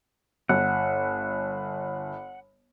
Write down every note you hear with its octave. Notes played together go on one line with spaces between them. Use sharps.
G1 F#5